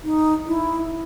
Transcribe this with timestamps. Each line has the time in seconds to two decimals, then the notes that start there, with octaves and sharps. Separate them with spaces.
0.04 D#4
0.47 E4